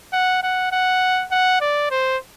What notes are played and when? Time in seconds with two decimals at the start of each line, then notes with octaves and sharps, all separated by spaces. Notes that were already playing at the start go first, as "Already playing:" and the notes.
0.13 F#5
0.43 F#5
0.72 F#5
1.31 F#5
1.61 D5
1.91 C5